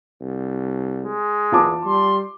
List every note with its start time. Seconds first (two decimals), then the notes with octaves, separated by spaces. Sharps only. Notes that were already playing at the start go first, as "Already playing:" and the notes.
0.21 C2
1.03 G#3
1.52 E2 F4 A5 D6
1.85 G3 C6